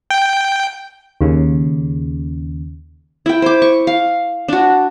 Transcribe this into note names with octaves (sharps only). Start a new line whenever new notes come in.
G5
D#2 C#3
E4 G5
C5 D6
C#6
F5
D4 F#4